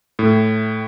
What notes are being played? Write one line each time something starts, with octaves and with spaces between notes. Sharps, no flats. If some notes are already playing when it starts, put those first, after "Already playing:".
A2